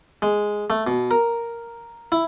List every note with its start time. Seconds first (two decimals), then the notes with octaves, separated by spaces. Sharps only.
0.22 G#3
0.70 A3
0.87 B2
1.11 A#4
2.12 E4